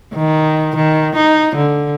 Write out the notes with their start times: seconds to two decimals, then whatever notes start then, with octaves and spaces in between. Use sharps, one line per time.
0.14 D#3
0.76 D#3
1.16 D#4
1.56 D3